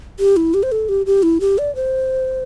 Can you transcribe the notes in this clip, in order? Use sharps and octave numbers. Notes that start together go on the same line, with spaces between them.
G4
E4
G4
C5
A4
G4
G4
E4
G4
D5
C5